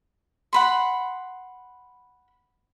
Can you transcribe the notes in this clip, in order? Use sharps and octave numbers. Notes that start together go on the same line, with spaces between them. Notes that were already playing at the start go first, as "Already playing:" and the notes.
F#5 B5 C6